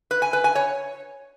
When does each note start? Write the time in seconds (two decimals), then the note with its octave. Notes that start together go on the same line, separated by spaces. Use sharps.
0.11 B4
0.22 G#5
0.33 B4
0.44 G#5
0.55 C#5